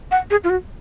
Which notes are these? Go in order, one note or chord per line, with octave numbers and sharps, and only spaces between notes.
F#5
G#4
F4
F#4